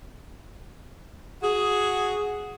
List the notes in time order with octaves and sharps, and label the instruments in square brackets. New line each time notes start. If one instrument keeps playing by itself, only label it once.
[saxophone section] F#4 G#4